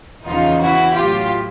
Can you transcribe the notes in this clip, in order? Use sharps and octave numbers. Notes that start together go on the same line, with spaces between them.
E2 C#3 F3 D#4 F4
E4 F#4
A2 F#3 F4 G4